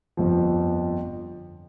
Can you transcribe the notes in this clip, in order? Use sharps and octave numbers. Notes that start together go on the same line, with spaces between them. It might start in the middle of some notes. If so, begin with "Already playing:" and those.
G1 F2 F3